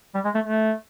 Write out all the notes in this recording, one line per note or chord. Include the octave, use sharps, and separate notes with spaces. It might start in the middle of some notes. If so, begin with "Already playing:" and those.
G3
G#3
A3
A3